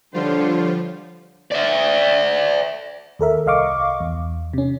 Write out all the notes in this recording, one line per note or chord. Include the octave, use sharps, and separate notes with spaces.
D3 F3 G3 F4 C5 C#5
D5 E5
D#2 A4 A#4 E5
C2 D#5 F5 C#6 D6
E2
C3 C#4